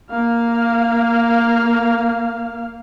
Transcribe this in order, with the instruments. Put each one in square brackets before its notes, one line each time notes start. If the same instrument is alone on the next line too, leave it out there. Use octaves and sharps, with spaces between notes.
[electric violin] A#3 F5